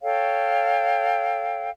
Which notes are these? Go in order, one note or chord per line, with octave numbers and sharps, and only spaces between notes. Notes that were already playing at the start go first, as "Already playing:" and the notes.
A4 C#5 F5 G5